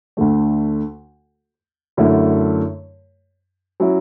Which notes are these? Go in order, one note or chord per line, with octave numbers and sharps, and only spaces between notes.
D2 D3 A3
F#2 D3 A3 E4
F#3 C#4 E4